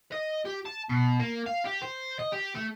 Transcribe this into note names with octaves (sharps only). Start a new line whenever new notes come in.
D#5
G4
A5
B2
A#3
F5
G4
C5
D#5
G4
A3